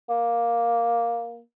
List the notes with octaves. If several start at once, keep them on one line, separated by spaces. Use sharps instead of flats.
A#3